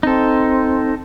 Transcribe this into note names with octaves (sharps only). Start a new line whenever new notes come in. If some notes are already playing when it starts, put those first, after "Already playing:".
C4 D#4 A4